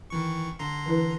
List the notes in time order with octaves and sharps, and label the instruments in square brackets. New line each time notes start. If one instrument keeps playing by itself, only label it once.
[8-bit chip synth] D#3 E3 C#6
D3 A#5 C6
[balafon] E3 E4 B4